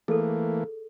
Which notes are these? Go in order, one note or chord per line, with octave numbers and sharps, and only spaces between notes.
E3 A3 A#3 G#4 A4